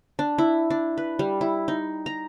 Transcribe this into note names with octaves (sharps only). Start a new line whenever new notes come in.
D4
E4
D4
B4
G3
E4
D#4
A#5